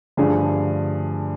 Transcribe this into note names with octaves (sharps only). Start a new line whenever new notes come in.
G2 D3 F3 A3 G#4